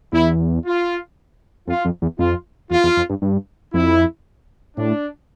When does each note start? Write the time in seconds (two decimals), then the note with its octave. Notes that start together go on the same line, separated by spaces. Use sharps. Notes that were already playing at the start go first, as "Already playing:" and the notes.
0.12 E2 E4
0.65 F4
1.67 F2 F4
1.85 F2
2.02 E2
2.19 F2 F4
2.70 E2 F4
2.84 E2
2.97 F2
3.10 G2
3.22 G2
3.73 F2 E4
4.77 A2 D4